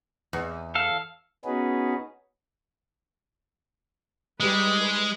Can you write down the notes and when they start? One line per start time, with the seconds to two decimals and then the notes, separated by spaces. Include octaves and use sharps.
0.33 E2
0.75 A4 F5
1.45 B3 C#4 D#4 F#4 G#4 B4
4.40 G3 G#3 D#4 B4
4.80 B4